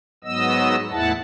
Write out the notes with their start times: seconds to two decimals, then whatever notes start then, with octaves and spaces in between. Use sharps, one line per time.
0.24 G#2 F#3 B3 D#5 E6
0.91 E2 A2 E4 F#5 A5